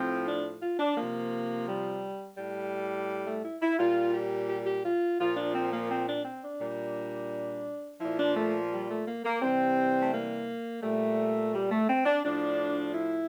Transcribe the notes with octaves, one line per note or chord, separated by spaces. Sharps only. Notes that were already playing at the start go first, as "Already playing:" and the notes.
Already playing: A2 F3 C4
D4
F4
D4
C3 F3 A#3
G3
A2 G3
A3
E4
E4
A#2 G3 F4
G4
G4
G4
F4
A#2 F3 F4
D4
C4
A#3
C4
D4
C4
D4
A#2 G3
A#2 F3 E4
D4
A3
G3
A3
A#3
A#3
C3 E3 G3 C4
A3
A#3
A#2 G3 A3
G3
A3
C4
D4
A2 F3 D4
E4